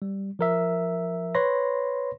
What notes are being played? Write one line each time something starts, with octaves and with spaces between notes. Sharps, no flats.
G3
F3 A#4 E5
B4 C#5 B5 C6 A#6